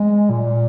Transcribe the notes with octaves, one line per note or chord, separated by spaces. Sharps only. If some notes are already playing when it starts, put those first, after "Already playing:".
Already playing: G#3
A#2